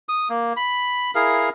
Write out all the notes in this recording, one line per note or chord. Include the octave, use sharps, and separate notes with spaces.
D#6
A#3
B5
E4 G#4 A#4 F5